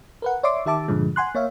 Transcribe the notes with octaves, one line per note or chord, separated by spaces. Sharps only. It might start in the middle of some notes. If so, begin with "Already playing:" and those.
A#4 B4 F#5
C#5 D5 E5 C6 D6
D#3 G4 E5 A5 D6
G2 A#2 D3 F3 G#3
F#5 G#5 C6 F#6
A#3 C#5 E5 F5